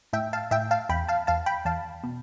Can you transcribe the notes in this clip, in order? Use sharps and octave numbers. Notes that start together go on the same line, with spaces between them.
A2 E5 G5
F5 A5
A2 E5 G5
F5 A5
E2 G5 B5
F5 A5
E2 F5 A5
G5 B5
E2 F5 A5
B2